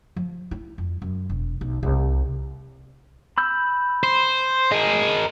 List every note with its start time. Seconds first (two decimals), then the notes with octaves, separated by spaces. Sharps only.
0.16 F3
0.51 E4
0.78 F2
1.02 F#2
1.29 E1
1.61 B1
1.83 C2
3.38 B5 E6 G6
4.03 C5
4.72 G#4 A#4 D#5